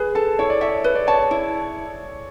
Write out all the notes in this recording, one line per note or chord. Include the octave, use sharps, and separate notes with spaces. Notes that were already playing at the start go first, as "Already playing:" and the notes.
Already playing: G#4 B4
A4 A5
E4 C#5
D5
C#5 E5
B4
D5
C#5 A5
D5
E4